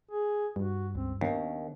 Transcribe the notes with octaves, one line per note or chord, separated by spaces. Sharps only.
G#4
G2 F#4
C#2 C4
D#2 D#3 B3 C#4 D4